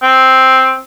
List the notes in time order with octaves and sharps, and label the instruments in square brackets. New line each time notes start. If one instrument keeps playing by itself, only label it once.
[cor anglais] C4